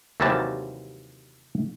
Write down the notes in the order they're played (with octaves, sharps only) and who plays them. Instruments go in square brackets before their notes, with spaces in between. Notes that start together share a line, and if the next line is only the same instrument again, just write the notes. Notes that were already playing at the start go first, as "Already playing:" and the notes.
[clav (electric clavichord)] D#2 C3 E3 F#3 G3 A5